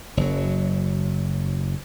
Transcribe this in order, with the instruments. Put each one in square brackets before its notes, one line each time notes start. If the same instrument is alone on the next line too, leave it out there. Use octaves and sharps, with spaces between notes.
[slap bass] F#1 F#3